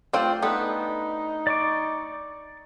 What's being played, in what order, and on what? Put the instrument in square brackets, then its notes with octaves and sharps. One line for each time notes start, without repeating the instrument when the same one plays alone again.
[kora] A3 D5 [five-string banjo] C4 F4 G5
[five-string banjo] B3 [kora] D4 G4 A4 [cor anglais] D#4
[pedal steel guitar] D5 C#6 D6